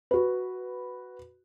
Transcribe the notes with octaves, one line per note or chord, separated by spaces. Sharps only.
F#4 B4